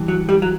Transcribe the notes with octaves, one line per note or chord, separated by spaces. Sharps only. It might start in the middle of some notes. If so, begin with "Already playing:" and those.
Already playing: G2 E3
F#3
G3
F#3